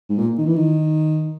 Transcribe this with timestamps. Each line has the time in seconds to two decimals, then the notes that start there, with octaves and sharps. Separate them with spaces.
0.09 G#2
0.18 A#2
0.38 D#3
0.46 E3
0.56 D#3